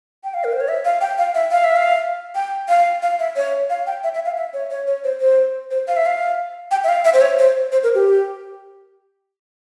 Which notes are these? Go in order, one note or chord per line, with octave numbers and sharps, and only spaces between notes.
G5
F5
A#4
C5
C#5
E5
F5
G5
F5
E5
F5
E5
F5
G5
F5
F5
E5
C#5
F5
G5
E5
E5
F5
E5
C#5
C#5
C#5
C5
C5
C5
F5
E5
F5
G5
E5
F5
E5
C5
C#5
C5
C5
A#4
G4